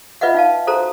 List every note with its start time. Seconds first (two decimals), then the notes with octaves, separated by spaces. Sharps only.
0.21 F4 B4 D#5 E5 F#5
0.34 D#4 F5 A5
0.67 F#4 A4 C5 A#5